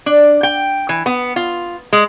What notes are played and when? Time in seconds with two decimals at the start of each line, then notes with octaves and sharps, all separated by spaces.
0.06 D4
0.43 G5
0.89 E3
1.06 B3
1.36 F4
1.93 G#3